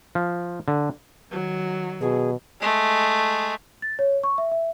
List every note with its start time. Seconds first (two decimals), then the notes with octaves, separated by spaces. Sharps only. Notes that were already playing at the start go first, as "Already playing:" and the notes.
0.15 F3
0.68 D3
1.29 D#3 F#3
2.01 B2 G#4
2.61 G#3 A3
3.82 A6
3.99 C#5
4.23 C#6
4.38 E5
4.51 E5